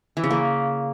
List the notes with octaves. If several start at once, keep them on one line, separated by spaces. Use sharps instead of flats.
E3
C#3
A#3